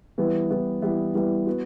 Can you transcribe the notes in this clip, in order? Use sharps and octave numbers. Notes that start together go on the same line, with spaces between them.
E3 G3 B3 E4
E3 G3 B3 E4
E3 G3 B3 E4
E3 G3 B3 E4
B3 F#4